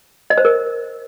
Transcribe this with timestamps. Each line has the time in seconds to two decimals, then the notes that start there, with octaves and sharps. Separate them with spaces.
0.30 D#5
0.38 C5
0.45 A#4